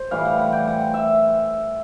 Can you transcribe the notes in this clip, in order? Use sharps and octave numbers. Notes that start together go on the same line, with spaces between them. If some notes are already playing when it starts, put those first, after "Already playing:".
Already playing: C5
A2 E3 G3 F5
F#5
F#5
G5
F#5
E5